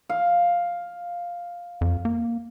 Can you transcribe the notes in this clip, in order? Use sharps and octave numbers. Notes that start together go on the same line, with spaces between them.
F5
F2
A#3